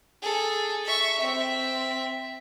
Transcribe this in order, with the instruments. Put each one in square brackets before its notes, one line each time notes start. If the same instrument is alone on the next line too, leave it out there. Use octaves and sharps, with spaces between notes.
[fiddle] G#4 A4
E5 C#6
C4 E5